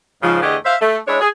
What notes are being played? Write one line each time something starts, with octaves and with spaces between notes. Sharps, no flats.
G#2 C#3 F3
E2 D3 A3 G4 G#4 D#5
C5 E5 F5
A3
G#3 D4 E4 G#4 C#5
G#4